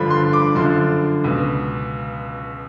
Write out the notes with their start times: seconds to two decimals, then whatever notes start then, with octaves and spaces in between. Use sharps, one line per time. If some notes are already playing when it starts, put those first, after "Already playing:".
Already playing: G2 D3 F3 B5
0.10 C6
0.33 D6
0.55 F#2 D3 F3 C6
1.24 C#2 B2